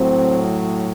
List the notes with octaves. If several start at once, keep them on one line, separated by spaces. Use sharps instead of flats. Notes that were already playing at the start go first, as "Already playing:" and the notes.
Already playing: A2 F#3 C4